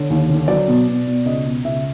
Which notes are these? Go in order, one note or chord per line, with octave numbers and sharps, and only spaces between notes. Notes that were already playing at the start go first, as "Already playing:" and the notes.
Already playing: D3 C#5
D#2
D3
F#3 D5
B2
B2
B2
C#2 D#5
B2
C#2 E5